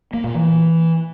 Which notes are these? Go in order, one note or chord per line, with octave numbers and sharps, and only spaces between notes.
A#3
A#2
E3